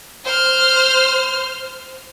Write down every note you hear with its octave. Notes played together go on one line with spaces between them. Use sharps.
C5 F6